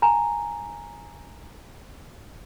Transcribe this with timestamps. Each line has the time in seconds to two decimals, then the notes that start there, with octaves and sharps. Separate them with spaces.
0.02 G#5 A#5